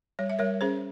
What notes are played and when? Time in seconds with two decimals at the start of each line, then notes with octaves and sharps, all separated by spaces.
0.19 G3 C#5
0.30 E5
0.39 G3 A#4 C#5
0.61 C#4 G#4 C5